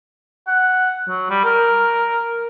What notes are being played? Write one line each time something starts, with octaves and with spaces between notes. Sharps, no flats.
F#5
F#3
G3
A#4